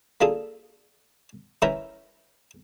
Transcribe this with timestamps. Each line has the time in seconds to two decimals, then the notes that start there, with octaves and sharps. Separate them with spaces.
0.21 A#3 D4 F4 G#4 A4
1.62 E3 C#4 E4 A#4 G5 A#5